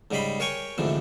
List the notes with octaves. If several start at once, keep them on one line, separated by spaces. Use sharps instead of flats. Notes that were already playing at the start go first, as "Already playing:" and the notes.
G#2 C#3 G3 D#5 B5 C6
A#4 C#5 G5 G#5 C#6
D2 G#2 C3 E3 F3